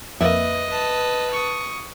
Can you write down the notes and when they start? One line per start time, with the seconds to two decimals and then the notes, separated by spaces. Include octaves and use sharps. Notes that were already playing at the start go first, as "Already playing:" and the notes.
0.21 F2 A#3 B4 D#5 E5
0.69 B4 A5
1.31 C#6 D#6